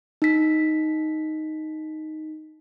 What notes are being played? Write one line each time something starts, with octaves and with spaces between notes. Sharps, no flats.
D#4 B6